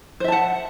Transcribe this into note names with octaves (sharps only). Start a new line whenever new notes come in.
C5 E5 F#5 A5